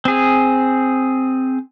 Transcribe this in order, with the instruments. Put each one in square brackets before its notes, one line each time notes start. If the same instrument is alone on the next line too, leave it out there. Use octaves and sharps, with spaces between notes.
[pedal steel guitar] C4 G#4